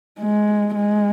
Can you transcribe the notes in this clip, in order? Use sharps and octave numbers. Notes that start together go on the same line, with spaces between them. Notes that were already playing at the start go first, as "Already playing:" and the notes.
G#3
G#3